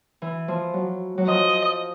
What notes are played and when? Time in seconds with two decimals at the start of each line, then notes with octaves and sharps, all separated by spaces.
0.22 E3
0.48 F3
0.74 F#3
1.18 F#3
1.27 F3 D#5